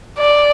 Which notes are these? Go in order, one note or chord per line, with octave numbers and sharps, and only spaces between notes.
D5